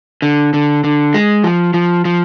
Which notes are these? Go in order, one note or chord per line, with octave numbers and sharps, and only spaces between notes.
D3
D3
D3
G#3
F3
F3
F3